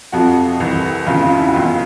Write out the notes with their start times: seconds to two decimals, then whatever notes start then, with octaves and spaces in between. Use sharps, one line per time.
0.12 F2 C3 F3 F#4
0.60 C2 C3 E3
1.07 F1 E2 C#3 F4
1.23 F4
1.38 E4
1.48 F#4
1.54 E1 E2 B2 F4